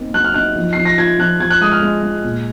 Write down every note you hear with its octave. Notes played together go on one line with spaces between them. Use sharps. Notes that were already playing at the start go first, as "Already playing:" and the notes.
Already playing: A#3 C4 D#4
F#3 F#6
F6
D#4 F#6
F3
F3 C7
A#6
F4 G#6
F3 F#6
F3 G#6
F#6
G#3 D#6
F6
G#3
G#3
A#2